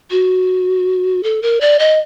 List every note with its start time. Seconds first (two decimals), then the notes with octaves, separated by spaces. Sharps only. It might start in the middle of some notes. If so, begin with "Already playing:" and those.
0.11 F#4
1.23 A4
1.42 A#4
1.61 D5
1.79 D#5